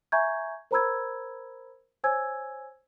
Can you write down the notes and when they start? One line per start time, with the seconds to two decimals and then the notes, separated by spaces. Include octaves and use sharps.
0.12 E5 G#5 A#5 C#6 G6 G#6
0.71 A#4 C5 A#5 B5 E6 G#6
2.04 C5 C#5 G#5 E6 G#6